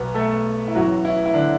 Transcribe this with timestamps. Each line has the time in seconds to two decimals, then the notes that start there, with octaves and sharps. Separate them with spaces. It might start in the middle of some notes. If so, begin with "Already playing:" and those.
Already playing: B1 B2 F#3 B3 B4
0.15 A3 A4
0.68 E4
0.75 A1 A2 E3 F#3 F#4
1.05 E3 E4
1.26 E4
1.34 D3 D4